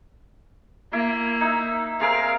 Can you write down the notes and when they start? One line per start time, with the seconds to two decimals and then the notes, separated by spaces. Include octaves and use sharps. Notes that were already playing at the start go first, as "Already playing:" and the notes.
0.93 A#3 E4
1.41 D#4 E5
2.00 C4 G#4 A#4 F5